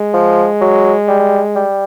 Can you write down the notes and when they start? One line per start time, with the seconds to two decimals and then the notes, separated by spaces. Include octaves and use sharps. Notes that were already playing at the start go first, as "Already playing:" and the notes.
Already playing: G#3
0.14 F3
0.61 F#3
1.08 G3
1.55 G3